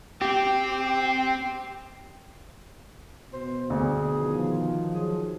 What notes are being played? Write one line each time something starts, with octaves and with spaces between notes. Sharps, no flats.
C4 G4
B2 C5
D2 G#4
D#3 F3
F#3 G#4